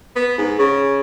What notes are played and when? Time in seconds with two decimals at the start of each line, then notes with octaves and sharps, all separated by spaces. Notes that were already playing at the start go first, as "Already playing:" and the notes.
0.16 B3
0.38 G#2
0.59 C#3